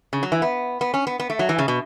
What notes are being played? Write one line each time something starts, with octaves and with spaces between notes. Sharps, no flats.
C#3
F#3
E3
B3
B3
C#4
B3
B3
A3
F#3
E3
C#3
B2